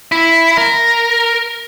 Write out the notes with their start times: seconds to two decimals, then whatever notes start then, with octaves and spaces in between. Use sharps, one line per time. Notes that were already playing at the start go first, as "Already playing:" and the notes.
0.12 E4
0.57 A#4